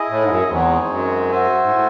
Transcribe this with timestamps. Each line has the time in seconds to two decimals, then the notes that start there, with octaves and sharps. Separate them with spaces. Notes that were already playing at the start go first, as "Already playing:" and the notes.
Already playing: E4 G#4 D#5
0.10 A2
0.22 G#2
0.29 F#2
0.50 E2 G#3 C4 D#4 G#4 C#5
0.90 F#2
1.31 F#4 C5 E5 G#5
1.63 G#2
1.71 A2